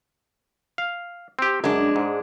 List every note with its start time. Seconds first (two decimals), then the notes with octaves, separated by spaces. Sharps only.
0.78 F5
1.39 C4 G4
1.64 F#2 G#3 D4
1.96 G#2